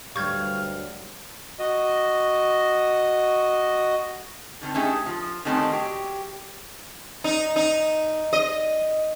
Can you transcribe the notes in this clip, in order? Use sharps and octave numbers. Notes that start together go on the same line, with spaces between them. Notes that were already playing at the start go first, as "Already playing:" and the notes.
D2 G2 F#3 G3 F5 C#6 G6 G#6
F#4 D#5
D3 D#3 C4
A3 C#4 D#4 G4 G#4 E5
F3
D#3 F#3 G3 A3 C4 C#4
F#3 G4
D#4
D#4
D#5